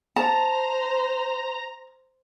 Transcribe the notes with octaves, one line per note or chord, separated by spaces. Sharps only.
C5 A5 A#5